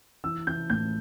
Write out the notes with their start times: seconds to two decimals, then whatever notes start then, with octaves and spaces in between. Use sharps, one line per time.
0.24 E3 E6
0.47 E3 G6
0.70 A2 G6